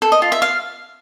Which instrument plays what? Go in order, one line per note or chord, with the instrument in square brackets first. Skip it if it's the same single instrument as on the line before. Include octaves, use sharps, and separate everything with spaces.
[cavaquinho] A4
D#5
F4
E5
F5